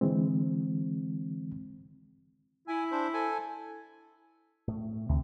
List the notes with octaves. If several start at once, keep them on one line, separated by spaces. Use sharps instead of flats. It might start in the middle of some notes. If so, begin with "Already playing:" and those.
D3 E3 G#3 C4
E4 G#5
D4 C5
A4 G#5
A2 A3
D2 C3 C4